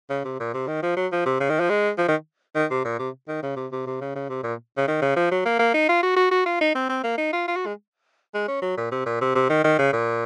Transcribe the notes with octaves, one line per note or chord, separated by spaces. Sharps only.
C#3
C3
A#2
C3
D#3
F3
F#3
F3
C3
C#3
D#3
F3
G#3
F3
D#3
D#3
C3
A#2
C3
D#3
C#3
C3
C3
C3
C#3
C#3
C3
A#2
C#3
D#3
C#3
F3
F#3
A#3
A#3
D#4
F4
F#4
F#4
F#4
F4
D#4
C4
C4
A#3
D#4
F4
F4
F#4
G#3
G#3
C#4
F#3
A#2
C3
A#2
C3
C3
D#3
D#3
C#3
A#2